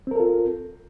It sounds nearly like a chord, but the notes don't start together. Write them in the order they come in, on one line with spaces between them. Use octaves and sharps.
C4 A#4 A4 F4